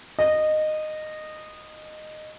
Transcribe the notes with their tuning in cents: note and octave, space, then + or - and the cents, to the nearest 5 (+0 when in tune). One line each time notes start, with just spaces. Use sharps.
D#5 -15